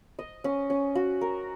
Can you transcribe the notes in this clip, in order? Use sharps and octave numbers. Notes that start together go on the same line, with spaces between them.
D#5
C#4
C#4
F#4
A#4